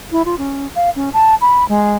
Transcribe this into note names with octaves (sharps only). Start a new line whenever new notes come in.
E4
F4
C#4
F5
C#4
A5
B5
G#3